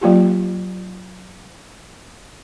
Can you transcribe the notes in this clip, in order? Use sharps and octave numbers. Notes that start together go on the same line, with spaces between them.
F#3 A#3 F4 G4